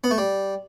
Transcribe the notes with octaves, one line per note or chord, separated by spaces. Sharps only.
B3
A3
G3